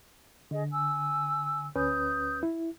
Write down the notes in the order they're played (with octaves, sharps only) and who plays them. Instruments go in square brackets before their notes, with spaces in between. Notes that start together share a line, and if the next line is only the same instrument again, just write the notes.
[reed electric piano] D3 [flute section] G#4 D#5
[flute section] G#5 E6
[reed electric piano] D2 C#4 B4 [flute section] D#6 G6
[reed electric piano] E4